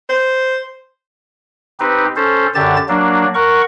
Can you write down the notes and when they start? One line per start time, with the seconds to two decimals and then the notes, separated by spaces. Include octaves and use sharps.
0.09 C5
1.80 C4 D#4 G4 B4
2.16 C#4 A4 C5
2.55 F#2 D3 G4 A5 A6
2.88 F#3 A#3 D4
3.35 A#4 F#5 C#6